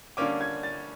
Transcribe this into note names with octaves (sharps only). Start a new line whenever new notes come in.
D3 G3 A#3 C#4 D6
G#6
A6